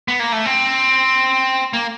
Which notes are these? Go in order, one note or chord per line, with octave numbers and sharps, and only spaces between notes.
B3
A#3
A3
C4
A#3